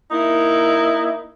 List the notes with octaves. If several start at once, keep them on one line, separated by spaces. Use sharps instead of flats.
A#3 D#4 E4